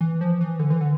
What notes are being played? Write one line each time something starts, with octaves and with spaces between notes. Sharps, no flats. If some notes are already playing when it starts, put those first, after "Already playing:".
E3
F3
E3
D3
E3
D3